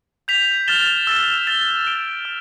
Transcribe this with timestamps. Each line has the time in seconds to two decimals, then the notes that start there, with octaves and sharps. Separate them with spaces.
0.28 G6 B6 F7
0.68 F6 A6 E7 G7
1.07 E6 A6 E7
1.47 A6 E7 G7
1.87 A6 D7 G7
2.25 F6